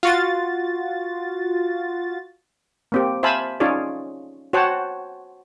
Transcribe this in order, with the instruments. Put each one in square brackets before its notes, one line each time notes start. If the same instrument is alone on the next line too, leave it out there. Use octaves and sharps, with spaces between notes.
[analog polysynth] F4 F#4 A6
[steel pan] A#3 C4 G4
C5 E5 F5 G#5 A5 B5
C#4 D#4 F4 G#4 C#5 D5
F#4 C5 C#5 F#5 G5 A5